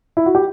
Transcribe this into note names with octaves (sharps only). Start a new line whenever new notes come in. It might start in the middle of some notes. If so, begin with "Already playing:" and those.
E4
F#4
G4